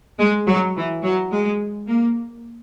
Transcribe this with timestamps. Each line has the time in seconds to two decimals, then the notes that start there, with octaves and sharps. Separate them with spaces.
0.19 G#3
0.47 F#3
0.75 E3
1.03 F#3
1.31 G#3
1.87 A#3